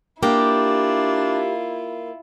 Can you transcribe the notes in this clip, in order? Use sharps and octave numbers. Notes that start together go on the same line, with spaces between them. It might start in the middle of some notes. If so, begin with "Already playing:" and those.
A#3 D4 E4 F4 G4